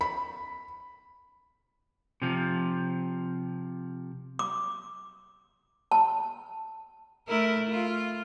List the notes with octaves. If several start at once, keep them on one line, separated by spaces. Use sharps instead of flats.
B5
C3 F3
D6
A5
A3 E4 A#4
F4